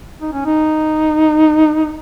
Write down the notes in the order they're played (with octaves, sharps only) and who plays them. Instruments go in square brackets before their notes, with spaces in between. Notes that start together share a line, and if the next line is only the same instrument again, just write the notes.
[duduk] D#4
C#4
D#4